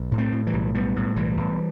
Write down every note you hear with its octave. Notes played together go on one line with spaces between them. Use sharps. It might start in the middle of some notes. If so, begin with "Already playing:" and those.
Already playing: B1
A2
A3 C4
A2
E3 G3
B1
A2 G3 B3
A2
B1 E3 G3
B1